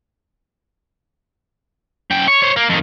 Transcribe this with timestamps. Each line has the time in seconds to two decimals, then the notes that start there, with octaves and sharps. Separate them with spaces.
2.11 F#2 G5
2.28 C#5
2.43 C5 C#5
2.57 A#3
2.70 F2 D#3